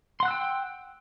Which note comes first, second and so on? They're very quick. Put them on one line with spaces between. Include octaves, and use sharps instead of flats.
C6 F#5 F#6 E6 G5